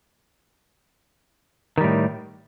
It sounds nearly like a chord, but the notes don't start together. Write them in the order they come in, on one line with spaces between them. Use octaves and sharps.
D#3 G3 A2